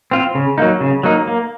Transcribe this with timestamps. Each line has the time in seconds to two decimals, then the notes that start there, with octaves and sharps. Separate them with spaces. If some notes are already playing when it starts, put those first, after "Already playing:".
0.11 C4 F4
0.35 C#3
0.58 F#3 A#3 D#4
0.81 C#3
1.03 F#3 A#3 D#4
1.27 A#3